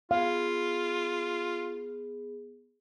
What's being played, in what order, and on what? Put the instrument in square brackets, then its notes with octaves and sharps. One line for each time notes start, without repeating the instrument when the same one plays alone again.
[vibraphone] B3 G#4 [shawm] F4 [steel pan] F5